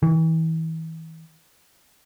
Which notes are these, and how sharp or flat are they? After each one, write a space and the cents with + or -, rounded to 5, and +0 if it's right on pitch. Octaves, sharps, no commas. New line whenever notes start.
E3 -35